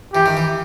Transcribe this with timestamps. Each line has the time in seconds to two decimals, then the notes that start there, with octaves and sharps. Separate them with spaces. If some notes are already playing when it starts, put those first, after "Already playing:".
0.13 E3 G4
0.26 D#3
0.37 E3